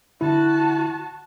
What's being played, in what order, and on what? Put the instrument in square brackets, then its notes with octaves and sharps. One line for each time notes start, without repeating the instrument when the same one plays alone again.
[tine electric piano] D3 E4 [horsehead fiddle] F#4 A5